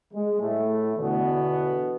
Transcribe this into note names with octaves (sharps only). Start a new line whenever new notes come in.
G#3
A2 A3
E2 B2 D3 B3